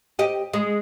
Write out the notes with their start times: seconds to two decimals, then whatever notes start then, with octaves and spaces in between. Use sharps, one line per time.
0.19 G4 D#5
0.54 G#3